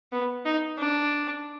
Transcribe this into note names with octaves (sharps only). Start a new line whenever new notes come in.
B3
D#4
D4